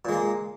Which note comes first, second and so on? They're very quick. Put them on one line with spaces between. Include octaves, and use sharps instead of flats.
A#2 G#3 A#3